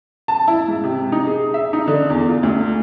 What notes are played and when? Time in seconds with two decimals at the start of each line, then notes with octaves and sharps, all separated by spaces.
0.28 A5
0.48 E4
0.68 G#2
0.84 C3
1.12 D#4
1.27 G#4
1.54 E5
1.73 D#4
1.88 D3
2.10 E2
2.28 F4
2.43 D2